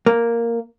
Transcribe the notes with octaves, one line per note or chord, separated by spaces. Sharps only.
A#3